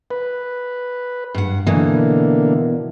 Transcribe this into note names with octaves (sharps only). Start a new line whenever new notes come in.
B4
G2 F#5
B2 D3 E3 A#3